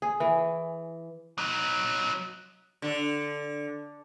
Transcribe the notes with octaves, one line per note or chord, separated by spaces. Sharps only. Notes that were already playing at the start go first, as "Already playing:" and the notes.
G#4
E3
F#3 D#4
D3